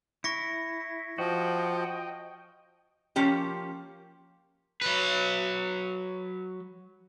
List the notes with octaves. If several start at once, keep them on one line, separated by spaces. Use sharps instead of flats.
E4 C#6 A#6 C#7
F3 F#4 D#5 G5
F3 A#3 C#4 G4
F#3 B4